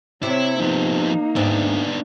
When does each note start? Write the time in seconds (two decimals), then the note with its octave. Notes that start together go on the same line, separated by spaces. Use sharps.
0.23 C3 C4 E4 C#5
0.60 F3 A#3 B3 D#4
1.36 D2 G#2 B3 C4 D4